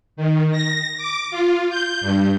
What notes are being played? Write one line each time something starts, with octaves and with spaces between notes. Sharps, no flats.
D#3
A#6
D6
F4
G6
G2